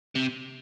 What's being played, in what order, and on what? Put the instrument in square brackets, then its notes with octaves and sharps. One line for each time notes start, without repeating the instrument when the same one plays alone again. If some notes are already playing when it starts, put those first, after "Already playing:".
[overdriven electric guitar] C3